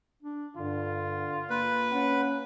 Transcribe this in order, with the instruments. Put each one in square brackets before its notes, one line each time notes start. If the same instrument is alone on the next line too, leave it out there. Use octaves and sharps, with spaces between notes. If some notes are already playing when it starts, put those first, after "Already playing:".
[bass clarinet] D4
[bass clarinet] G2 [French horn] D3 [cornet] F4
[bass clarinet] A#3 [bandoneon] B4
[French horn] C#4 [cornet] F#5